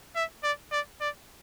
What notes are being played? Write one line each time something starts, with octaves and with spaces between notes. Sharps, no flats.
E5
D5
D5
D5